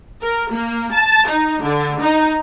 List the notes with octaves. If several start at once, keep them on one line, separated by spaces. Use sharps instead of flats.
A#4
A#3
A5
D#4
D3
D#4